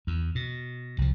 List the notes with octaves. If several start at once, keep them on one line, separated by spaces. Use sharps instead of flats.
E2
B2
C2 F3